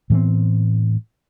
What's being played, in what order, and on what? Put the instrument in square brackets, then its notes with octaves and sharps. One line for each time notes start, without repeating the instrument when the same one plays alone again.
[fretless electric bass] A2 E3 B3 C4